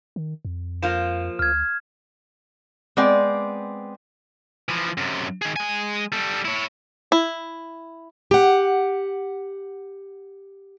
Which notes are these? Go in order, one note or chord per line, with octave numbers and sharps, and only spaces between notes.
D#3
F2
F3 A#3 F4 E7
D2 F6 G#6
G#3 B3 C4 D5
E3 F3
F#2 C3
D#3 G#4
G#3 G#5
G3 A4
E4 C#5
E4
G4 F#5